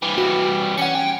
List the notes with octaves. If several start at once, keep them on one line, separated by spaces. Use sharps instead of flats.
E3 G3
F#4
C#4 F#5 C#7
G5